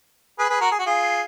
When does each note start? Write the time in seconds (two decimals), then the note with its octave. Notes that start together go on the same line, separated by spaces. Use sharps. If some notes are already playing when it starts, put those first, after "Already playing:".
0.39 G#4 B4
0.49 G#4 B4
0.60 F#4 A#4
0.71 G#4
0.79 F#4
0.86 F4 G#4